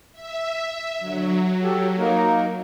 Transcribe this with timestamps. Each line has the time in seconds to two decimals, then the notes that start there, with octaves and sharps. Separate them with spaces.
0.13 E5
0.99 D3 F#3
1.62 G4 A4
1.97 A#3 D#4 A#4